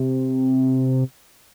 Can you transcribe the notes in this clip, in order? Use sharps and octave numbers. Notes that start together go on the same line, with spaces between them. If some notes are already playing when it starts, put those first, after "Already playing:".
Already playing: C3